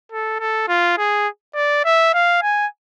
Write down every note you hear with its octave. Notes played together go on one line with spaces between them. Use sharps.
A4
A4
F4
G#4
D5
E5
F5
G#5